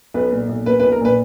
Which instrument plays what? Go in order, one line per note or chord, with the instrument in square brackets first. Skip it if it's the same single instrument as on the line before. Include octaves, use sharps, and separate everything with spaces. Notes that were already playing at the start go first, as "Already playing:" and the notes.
[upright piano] B1 B4
A#2
B1
A#3 B4
B4
B1
A#4
A#2 B4